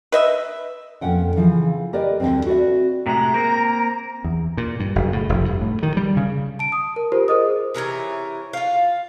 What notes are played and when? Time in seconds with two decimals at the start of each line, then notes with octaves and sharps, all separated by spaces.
0.12 B4 D#5 E5
1.01 F2 A#2 C#4 F#5 G5
1.36 C#3 E3 F3 E4
1.93 G4 A#4 B4 D5 D#5
2.20 D2 D3 D#3 G3 C4
2.47 F#4 B4 D5 E5
3.06 A2 C3 G#3 A#5
3.34 A#3 C4 A#4
4.24 E2
4.57 A#2
4.80 G2
4.95 F#1
5.13 A2
5.29 F1
5.45 G2
5.61 A2
5.83 D#3
5.97 G3
6.17 C#3
6.59 A5 D7
6.72 D#6
6.96 A#4
7.12 F4 G4 A#4 C5
7.28 G#4 A#4 C5 D#5 D#6
7.74 C3 E3 A#4 C#5
8.53 F4 F5